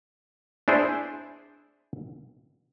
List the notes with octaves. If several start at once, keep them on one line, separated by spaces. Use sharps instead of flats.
D4 E4 G#4 C5